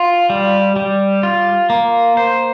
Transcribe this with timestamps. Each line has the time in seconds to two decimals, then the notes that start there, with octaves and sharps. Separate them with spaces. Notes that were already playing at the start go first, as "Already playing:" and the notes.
Already playing: F4
0.30 G3
0.76 G3
1.23 F4
1.70 A#3
2.17 C5